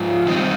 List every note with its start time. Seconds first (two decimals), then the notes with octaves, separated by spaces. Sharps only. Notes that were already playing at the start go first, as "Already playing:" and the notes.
Already playing: G#2 F3 F4
0.27 D#3 G3 C4 D#4